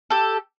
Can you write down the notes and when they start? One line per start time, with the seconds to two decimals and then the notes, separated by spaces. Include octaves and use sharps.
0.10 G4 A4